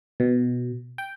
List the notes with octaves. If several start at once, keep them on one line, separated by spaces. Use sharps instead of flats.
B2
G5